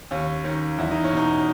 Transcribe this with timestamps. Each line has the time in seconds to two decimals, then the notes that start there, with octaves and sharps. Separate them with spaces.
0.11 D#2 C#4
0.44 D#3 C#4
0.78 E2 E4
0.91 D#4
1.04 C#4
1.12 B2 D#4